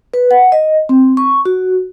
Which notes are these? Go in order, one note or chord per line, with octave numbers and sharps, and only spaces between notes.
B4
F#5
D#5
C4
C#6
F#4